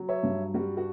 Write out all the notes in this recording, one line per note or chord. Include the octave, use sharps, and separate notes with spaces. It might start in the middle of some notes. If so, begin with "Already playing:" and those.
Already playing: F#3
C#5 E5
G2
G3 F#4
F#4